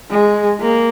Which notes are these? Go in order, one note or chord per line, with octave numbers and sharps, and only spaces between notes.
G#3
A#3